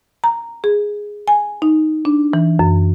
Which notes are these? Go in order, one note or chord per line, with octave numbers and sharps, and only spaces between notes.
A#5
G#4
G#5
D#4
D4
E3
F#2